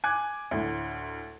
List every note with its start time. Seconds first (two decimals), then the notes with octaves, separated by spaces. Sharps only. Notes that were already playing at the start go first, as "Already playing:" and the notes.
0.04 G#5 D6 F#6 G#6
0.51 D2 A2